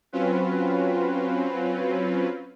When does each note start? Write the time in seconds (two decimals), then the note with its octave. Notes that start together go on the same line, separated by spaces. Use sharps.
0.13 F#3 C4 C#4 F4 B4